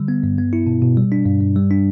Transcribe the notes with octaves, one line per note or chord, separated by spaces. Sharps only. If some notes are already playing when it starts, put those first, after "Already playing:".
Already playing: D3 G3
B3
G2
B3
E4
B2
B2
G3
D4
G2
G2
G3
D4